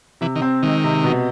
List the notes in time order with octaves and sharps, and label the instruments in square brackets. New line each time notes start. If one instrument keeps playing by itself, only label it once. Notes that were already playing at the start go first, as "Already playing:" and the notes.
[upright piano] C3 [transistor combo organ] E3
[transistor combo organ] D#3
[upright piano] C4
[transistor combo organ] D#3 [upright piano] G#3
[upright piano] C3
B2